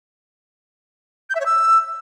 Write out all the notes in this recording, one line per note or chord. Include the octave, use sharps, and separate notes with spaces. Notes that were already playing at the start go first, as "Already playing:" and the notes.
G6
E5
C#5
E6